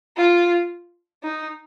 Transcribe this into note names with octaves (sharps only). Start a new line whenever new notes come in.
F4
D#4